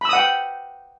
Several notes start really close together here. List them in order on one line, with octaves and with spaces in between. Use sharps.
B5 E6 D#6 F#5 G5